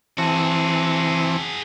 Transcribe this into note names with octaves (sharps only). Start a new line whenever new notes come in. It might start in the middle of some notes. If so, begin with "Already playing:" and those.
E3 C4 F#4 G#4 A5